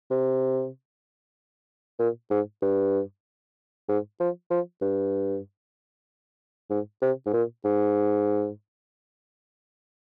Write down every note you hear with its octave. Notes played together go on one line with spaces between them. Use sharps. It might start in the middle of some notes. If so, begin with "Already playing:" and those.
C3
A#2
G#2
G2
G#2
F3
F3
G2
G#2
C3
G#2
A#2
G#2